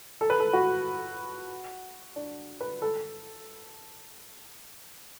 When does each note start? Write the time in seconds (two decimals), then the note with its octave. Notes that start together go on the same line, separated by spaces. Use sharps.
0.21 A4
0.30 B4
0.40 A4
0.53 F#4
2.16 D4
2.61 B4
2.82 A4